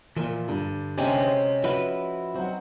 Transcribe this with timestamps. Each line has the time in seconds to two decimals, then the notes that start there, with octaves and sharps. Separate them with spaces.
0.17 A#2 E3 F3 A#4
0.49 G2 D3
0.98 C3 G#3 C#4 G4
1.23 C5
1.64 F3 E4 F#4 B4 F6
2.36 F#3 C4 D#4 F#5